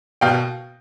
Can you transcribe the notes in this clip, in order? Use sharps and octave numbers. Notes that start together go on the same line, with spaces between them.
B2 F5 G5